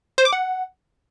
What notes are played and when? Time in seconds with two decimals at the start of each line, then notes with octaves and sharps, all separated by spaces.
0.18 C5
0.25 D6
0.33 F#5